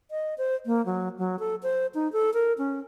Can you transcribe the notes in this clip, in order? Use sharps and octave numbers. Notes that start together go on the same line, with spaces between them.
D#5
C5
A#3
F#3
F#3
A4
C5
D#4
A4
A#4
C#4